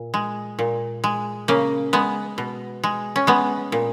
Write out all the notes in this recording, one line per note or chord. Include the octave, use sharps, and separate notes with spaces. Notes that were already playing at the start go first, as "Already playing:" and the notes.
Already playing: A#2
G#3
A#2
G#3
C#3 A#3
G#3 B3
B2
G#3
C#4
G#3 B3
A#2